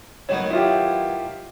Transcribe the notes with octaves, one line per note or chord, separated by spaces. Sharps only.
D#3 F#3 B3 C#5
E4 F4 G4